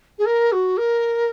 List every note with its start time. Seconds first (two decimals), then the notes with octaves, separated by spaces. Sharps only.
0.18 G#4
0.25 A#4
0.52 F#4
0.77 A#4